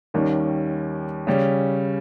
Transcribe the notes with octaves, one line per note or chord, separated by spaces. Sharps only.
D#2 D#3 G3 C#4
C#3 G3 C#4